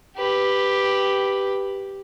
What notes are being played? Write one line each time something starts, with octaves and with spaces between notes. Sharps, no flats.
G4 B4